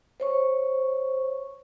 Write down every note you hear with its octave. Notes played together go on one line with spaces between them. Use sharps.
C5 C#5 C#6